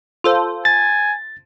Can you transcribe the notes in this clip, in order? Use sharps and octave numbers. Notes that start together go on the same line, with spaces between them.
F4 A4 C5
G#5 A6